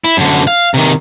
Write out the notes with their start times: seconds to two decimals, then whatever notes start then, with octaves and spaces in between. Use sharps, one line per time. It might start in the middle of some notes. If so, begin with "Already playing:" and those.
0.04 E4
0.17 F#2 D3
0.47 F5
0.74 C3 D#3